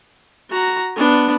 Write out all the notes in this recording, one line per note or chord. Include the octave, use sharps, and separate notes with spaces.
F#4 A#5
B3 D4